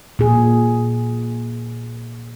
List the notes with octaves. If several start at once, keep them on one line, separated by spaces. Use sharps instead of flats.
A#2 G#4